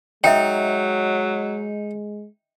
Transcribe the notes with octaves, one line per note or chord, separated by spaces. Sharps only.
F#3 G#3 D#4 E5 G5